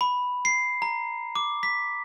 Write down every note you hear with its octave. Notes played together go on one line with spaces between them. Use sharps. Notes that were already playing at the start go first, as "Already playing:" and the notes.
B5
C7
A#5
D6
B6